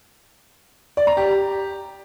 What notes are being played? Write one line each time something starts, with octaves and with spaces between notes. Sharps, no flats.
D5
A#5
G4